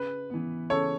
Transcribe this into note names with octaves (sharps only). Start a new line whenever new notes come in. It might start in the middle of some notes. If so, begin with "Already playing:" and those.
Already playing: C#3 B4
E3 B3
C#3 A4 C#5